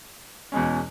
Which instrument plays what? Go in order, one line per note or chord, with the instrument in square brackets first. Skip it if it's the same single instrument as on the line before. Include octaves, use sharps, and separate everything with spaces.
[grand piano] E2 B2 G#3 C#4